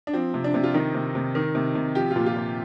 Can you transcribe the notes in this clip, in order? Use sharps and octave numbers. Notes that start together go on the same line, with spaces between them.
D4
F3 C4
C3
D4
C3
F4
D#3 D#4
C3
C3
D#3
C3
C3
F3 G4
F4
A#2
F4
A#2